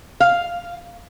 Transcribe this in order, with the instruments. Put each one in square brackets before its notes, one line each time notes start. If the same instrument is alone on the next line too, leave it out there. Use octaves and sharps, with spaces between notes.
[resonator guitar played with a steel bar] F5